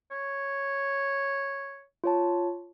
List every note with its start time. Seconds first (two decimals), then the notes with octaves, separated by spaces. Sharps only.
0.11 C#5
2.04 F4 C#5 A5